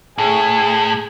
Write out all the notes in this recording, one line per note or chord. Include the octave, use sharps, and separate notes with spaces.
A2 G#4